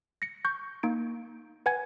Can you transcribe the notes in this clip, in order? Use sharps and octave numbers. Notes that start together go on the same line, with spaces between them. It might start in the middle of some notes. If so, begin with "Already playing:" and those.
A#6 C#7
C#6 G6
A#3 D#4 D7
B4 F#5 G#5 G#6